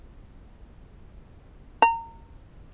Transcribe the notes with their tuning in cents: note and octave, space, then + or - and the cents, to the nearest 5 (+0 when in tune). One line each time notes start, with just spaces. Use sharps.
A#5 -25